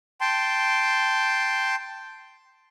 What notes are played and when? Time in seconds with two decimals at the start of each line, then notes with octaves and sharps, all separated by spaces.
0.21 G5 A5 C6